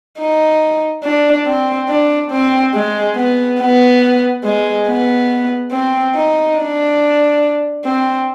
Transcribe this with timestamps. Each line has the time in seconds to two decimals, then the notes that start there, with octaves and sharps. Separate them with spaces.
0.19 D#4
1.04 D4
1.46 C4
1.89 D4
2.31 C4
2.74 G#3
3.16 B3
3.60 B3
4.44 G#3
4.88 B3
5.72 C4
6.15 D#4
6.58 D4
7.85 C4